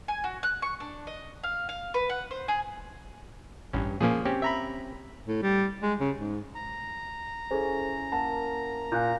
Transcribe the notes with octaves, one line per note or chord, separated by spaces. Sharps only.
G#5
F#4
F#6
C#6
D4
D#5
F5
F5
B4
F#5
C5
G#4
A1 G2 C#4
A#2 F3 A#3 C#4 G#4
C4 C#4 G4
E5 A#5 B5
A2
G3
G#3
C#3
G#2
A#5
C#4 E4 G#4 A4 C5
A#3 F#5 A5
A#2 G#5 F#6 G6